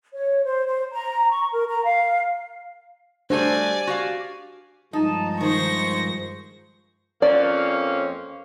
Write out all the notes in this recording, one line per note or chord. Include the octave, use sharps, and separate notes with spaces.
C#5
C5
C5
A#5
C#6
A#4
A#5
F5
G3 A3 D4 F#4 C5 D5 G#5
F#4 G4 F5
G2 F3 G#3 D#4 A5
D#3 C5 C#6 A#6
F2 A#3 C#4 D5